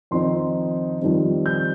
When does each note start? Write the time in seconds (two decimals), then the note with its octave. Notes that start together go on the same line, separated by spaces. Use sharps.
0.11 F2 D#3 C4 D#4 C6
1.00 F2 D#3 G3 C4 D#4
1.46 G6